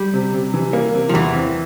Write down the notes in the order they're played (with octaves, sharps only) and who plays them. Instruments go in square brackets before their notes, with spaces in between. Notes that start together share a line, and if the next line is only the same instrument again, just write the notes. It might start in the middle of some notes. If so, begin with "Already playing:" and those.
Already playing: [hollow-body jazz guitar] G3
[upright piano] C3
C3
E3
A#3
C3
[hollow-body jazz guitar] F3
[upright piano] E2 [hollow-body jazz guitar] E3
[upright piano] C4